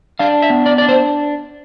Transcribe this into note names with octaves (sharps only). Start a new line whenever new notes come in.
D4 F5
E5
B3
D5
D4 D5
C5